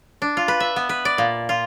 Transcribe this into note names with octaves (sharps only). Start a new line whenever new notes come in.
D4
F4
B4
E5
B3
B4
D5
A#2
F4